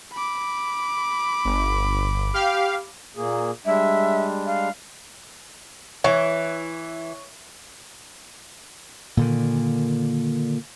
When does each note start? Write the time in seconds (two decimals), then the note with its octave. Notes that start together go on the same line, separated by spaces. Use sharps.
0.13 B5 D6
1.45 G1
2.34 G4 F5
3.16 A#2 A#3 G#4
3.65 G3 G#3 D4 E5
4.46 F5
6.04 E3 C#5
9.17 A#2 D3 D#3